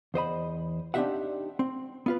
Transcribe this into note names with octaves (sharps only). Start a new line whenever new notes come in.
E2 C5 D#5 B5
C4 D4 D#4 G4 E5 F#5
C4
B3 F4 B4